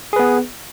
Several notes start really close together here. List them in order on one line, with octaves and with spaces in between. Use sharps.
G#4 B4 B3